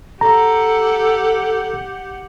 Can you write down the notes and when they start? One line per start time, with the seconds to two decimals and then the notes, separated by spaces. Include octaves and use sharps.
0.21 G4 A4 F#5 A#5